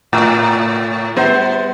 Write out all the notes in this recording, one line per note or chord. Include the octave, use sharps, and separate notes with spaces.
A2
G3 B3 C5